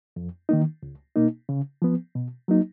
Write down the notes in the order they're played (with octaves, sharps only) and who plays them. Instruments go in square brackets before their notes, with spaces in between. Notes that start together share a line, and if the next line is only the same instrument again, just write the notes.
[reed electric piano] F2
D#3 A#3 D#4
C#2
B2 A#3 D#4
C#3
F3 B3
B2
F#3 A#3 D#4